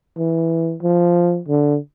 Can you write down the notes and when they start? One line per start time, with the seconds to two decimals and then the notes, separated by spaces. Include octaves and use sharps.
0.18 E3
0.82 F3
1.48 D3